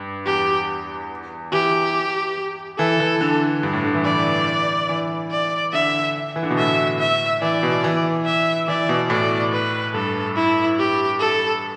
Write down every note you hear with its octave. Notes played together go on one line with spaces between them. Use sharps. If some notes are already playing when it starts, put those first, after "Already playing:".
Already playing: G2
E2 G4
E3 G4
E3 A4
E3
D3
G2
A2
D3
E3
E3 D5
E3
D5
D3 E5
E3
D3
B2
A2 E5
E5
E3 D5
B2
E3
E5
E3 D5
B2
A2 D5
B4
G2 A4
E4
G4
A4